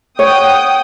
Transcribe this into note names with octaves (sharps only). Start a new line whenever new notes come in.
C#5 F#5 G5 D#6